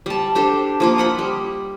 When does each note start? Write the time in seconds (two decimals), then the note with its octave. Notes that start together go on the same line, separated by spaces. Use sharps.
0.06 G3 A5
0.35 D4 G4 A4 C5
0.80 F3 A#3 F4
0.98 D#5 F#5 B5
1.19 G3